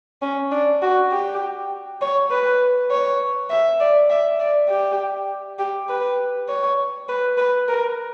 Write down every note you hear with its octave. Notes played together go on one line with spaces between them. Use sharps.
C#4
D4
F#4
G4
C#5
B4
C#5
E5
D5
E5
D5
G4
G4
B4
C#5
B4
B4
A#4